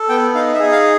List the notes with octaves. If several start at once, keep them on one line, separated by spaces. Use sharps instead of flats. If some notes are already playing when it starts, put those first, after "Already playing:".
Already playing: A4
B3 G5
D#4 F5
E5
G#4
F5